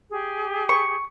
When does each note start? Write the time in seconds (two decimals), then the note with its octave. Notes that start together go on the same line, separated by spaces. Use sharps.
0.10 G4 G#4
0.69 C#6